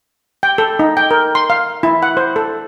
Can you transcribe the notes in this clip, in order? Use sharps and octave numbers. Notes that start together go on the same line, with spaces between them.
G5
A4
D#4
G5
A#4
C6
F5
E4
F#5
C5
A4